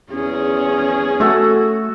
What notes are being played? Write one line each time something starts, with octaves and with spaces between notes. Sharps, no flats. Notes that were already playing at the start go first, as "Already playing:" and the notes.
E2 C#4 G#4
A3 F#4 A4 C#6